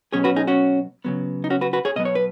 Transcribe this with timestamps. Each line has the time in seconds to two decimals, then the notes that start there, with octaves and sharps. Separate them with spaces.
0.12 B2 F#3 C#4 G#4 C#5
0.24 F#4 B4
0.36 D#4 G#4
0.47 C#4 F#4
1.05 C#3 F#3 B3
1.44 D#4
1.50 C#4 F#4
1.61 F#4 B4
1.73 F#4 B4
1.85 G#4 C#5
1.96 B2 F#3 B3 D#5
2.05 C#5
2.15 B4